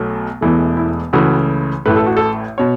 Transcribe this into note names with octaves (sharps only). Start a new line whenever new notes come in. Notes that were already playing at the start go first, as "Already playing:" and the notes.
Already playing: B1 B2 F#3 A3
E1 E2 E3 A3
E4
C#2 C#3 E3 A3 F#4
A1 A2 A3 B4
A4
F#4
A4
B2 C#5